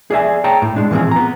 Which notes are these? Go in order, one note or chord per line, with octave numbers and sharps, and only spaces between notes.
G#4 D5 E5 G#5
C#5 G5 A5 A#5
A2
G#3 D4
A2 E3 F3 A#3 C4 G#4
B3 A#5